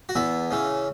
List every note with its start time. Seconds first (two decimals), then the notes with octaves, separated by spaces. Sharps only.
0.09 F#4
0.15 E2 B3 E4
0.51 C#3 E3